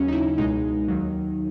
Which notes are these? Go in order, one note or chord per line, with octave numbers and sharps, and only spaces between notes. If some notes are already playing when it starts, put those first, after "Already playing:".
Already playing: D#2 C#3 F#3 C#4
D#4
E4
C#2 B2 G#3 D#4
D#2 D#3 F#3